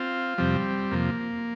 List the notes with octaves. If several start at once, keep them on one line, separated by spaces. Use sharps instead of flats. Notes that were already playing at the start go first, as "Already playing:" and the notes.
Already playing: C4 F4
F2 C3 F3 G3 C4
F2 C3 F3 A#3